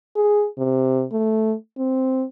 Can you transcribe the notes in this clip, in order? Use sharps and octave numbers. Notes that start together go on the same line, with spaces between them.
G#4
C3
A3
C4